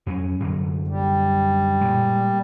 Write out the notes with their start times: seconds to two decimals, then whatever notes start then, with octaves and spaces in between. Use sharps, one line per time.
0.06 F2 F#3 C#4
0.40 F#2 D3 F#3
0.88 G3
1.81 A#2 G#3